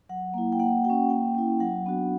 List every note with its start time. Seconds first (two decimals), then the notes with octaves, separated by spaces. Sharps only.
0.09 F#3 F#5
0.34 A#3 E4
0.53 G5
0.59 A#3 F#5
0.85 F#4 G5
0.90 C#4
1.10 A#3 G5
1.35 C#4 E4
1.60 F#3 F#5
1.86 B3 D4 F#4